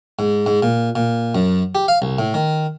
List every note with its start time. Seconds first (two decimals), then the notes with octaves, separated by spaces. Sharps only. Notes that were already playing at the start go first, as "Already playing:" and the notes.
0.19 G#2
0.46 G#2
0.63 A#2
0.96 A#2
1.35 F#2
1.75 G4
1.88 F5
2.02 C2
2.19 A2
2.34 D#3